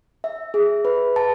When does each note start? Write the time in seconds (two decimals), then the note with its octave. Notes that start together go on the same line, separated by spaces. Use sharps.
0.24 E5
0.54 G#4
0.85 B4
1.16 A5